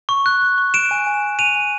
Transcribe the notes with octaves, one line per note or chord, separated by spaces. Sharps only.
C#6
F#6
F#6
C#6
C#6 D7 E7
G#5
G#5
G#5
G#5 D#7 F7
G#5